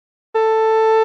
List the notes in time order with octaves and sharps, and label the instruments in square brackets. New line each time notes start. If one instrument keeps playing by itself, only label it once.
[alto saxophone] A4